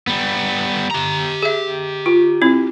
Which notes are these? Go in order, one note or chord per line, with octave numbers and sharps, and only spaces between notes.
G3 B3
G4 A#5
G#4 E5
F4
C4 E4